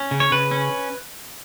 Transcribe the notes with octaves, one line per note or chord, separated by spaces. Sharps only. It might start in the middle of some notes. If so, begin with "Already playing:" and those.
Already playing: C#4
C#3
C#5
C#3 B4
C#4